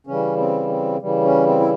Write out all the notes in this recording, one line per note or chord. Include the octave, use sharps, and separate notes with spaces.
C#3 E3 G3 C#4
C4
C4
C#3 E3 G3
C#4
C4
E4